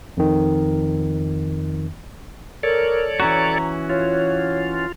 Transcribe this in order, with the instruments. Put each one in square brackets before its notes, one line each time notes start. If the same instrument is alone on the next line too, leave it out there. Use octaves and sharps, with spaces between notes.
[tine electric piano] F2 D#3
[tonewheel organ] A4 C#5 D5 [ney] A#4
[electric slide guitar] E3 C#4 F#4 [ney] A#5
[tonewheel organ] F4 [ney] C#5